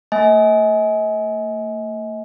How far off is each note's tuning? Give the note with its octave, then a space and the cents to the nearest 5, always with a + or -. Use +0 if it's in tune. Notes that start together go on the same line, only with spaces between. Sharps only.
A3 +45 D#5 +40 G#5 +15